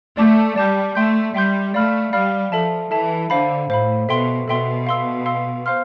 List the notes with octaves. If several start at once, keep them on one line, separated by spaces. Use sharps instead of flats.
A3 D5 A5 D6 G6
G3 D5 A5 D6 G6
A3 E5 G5 C6 G6
G3 E5 G5 C6 G6
A3 D5 F5 B5 F6
G3 D5 F5 B5 F6
F3 A4 E5 A5
E3 A4 E5 A5
D3 C5 F5 B5
A2 C5 F5 B5
B2 A4 E5 G5 C6
B2 A4 E5 G5 C6
F5 C6 E6
F5 C6 E6
C5 F5 C6 F6